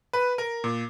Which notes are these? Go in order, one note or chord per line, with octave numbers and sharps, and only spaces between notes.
B4
A#4
A#2